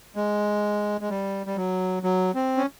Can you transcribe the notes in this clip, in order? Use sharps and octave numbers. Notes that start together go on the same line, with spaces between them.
G#3
G#3
G3
G3
F#3
F#3
C4
C#4